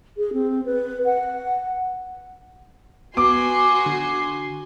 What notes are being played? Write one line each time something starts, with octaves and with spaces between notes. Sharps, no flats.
G#4
C4
B4
F#5
B3 F#4 G#5 C6 D6
D3